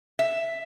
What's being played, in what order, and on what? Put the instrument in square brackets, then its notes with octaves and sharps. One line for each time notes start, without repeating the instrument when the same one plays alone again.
[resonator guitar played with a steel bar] E5